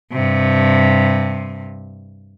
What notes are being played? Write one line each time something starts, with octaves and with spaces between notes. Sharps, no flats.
G2 C3